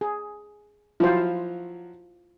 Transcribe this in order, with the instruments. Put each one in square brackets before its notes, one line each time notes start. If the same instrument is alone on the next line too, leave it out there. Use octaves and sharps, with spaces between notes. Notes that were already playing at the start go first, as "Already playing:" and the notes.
[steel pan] G#4
[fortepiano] F3 F#3 [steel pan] E4 F4 C5